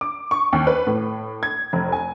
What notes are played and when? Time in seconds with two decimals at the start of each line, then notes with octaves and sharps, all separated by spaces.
0.01 D6
0.31 C#6
0.53 D#2
0.67 B4
0.87 A2
1.43 G#6
1.73 F1
1.92 G#5